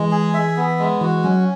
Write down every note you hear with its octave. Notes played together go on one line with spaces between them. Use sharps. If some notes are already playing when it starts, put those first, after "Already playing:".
Already playing: E3 G#3
G#4
E5
B3
G#3
E3 F#4
F#3 C#4